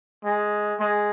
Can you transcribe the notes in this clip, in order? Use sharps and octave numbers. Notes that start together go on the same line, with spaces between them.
G#3
G#3